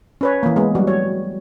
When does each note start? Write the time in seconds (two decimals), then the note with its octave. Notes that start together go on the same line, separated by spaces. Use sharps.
0.21 C#4 B4 C#5
0.43 E3 A#3
0.56 G#3 B3
0.75 F#3 G3 F#4
0.87 C#5